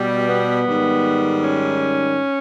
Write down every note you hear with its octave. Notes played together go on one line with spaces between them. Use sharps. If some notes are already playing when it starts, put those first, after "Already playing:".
Already playing: B2 G3
B3
G#2 D#3 G3
C#4